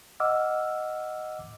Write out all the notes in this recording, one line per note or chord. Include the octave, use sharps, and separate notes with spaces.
D#5 F#5 D6 E6 F6